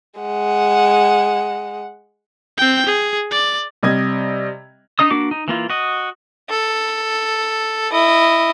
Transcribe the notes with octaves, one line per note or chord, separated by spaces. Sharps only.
G#3 F#5
C4 G5
G#4
D5
C3 G3 D#5 G#6
D4 D#4 D#5 D#6
A#3 D4 F#4 D6
D#4
E3 A#3 F4
F#4 D#5
A4
E4 D#5